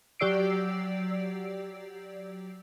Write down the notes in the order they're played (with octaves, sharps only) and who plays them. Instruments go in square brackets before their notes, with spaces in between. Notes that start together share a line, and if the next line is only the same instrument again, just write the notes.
[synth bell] F#3 G4 D5 E6 C7 D7